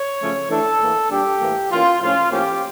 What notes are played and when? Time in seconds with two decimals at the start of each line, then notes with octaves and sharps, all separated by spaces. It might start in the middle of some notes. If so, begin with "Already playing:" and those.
Already playing: C#5
0.20 C#3 F3 A3 C#4
0.49 E3 A3 D4 A4
0.79 A2 E3 A#3
1.09 A#2 G3 D4 G4
1.40 A2 E3 A#3
1.70 E3 A#3 C#4 F4
2.01 A2 F3 C#4 F4
2.30 A2 F3 A#3 C#4 G4